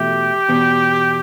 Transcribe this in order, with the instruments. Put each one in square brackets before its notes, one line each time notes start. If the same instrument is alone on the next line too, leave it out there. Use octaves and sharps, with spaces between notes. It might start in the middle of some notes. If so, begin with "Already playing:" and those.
Already playing: [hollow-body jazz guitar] E2 B2 A3 E4 [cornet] G4
[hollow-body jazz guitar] E2 B2 B3